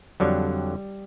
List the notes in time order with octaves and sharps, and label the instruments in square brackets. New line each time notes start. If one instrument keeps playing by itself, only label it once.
[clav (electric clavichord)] F2 D3 F#3 G3